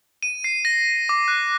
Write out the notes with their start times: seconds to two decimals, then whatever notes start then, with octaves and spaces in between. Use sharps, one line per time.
0.23 D#7
0.44 C7
0.65 A#6
1.09 D6
1.28 F#6